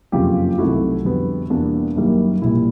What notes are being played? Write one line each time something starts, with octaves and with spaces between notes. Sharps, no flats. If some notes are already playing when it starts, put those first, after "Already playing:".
F#1 F2 C#3 F4 G4
C2 C3 D#3 F#3 A3 E4 F#4
F2 D3 G3 B3
E2 B2 G3 A#3 D4
F#1 F#2 D#3 G3 A#3
A#1 A#2 G3 E4